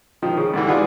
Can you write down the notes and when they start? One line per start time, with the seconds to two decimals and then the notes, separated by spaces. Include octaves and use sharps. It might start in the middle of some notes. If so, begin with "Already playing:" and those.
0.22 D#3 F3
0.37 C#3
0.54 G2 D3 E3
0.67 G#3 D4 F4 G#4 B4 F#5